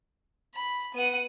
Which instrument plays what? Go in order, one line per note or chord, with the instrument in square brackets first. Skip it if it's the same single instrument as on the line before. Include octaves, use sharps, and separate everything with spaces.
[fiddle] B5
[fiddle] B3 F#5 [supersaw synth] D#7